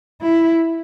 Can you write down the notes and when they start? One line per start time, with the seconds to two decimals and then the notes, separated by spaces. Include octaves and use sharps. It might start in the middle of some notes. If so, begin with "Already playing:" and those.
0.22 E4